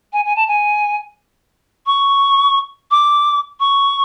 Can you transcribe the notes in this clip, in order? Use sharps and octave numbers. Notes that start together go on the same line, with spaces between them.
G#5
G#5
A5
G#5
C#6
D6
C#6